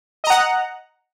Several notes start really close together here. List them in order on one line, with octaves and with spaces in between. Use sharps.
D#5 A#5 F#5